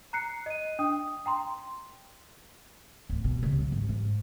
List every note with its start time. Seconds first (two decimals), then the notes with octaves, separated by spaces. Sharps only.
0.13 A#5 F#6 C7 C#7
0.46 D#5 D#7
0.79 D4 G5 D#6
1.26 G5 A#5 C6
3.09 D1
3.24 B2
3.43 C#2
3.58 F#3
3.72 G#1
3.89 G#2